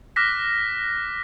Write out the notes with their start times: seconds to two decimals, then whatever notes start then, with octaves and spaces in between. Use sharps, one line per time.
0.16 D6 F6 F#6 A#6 B6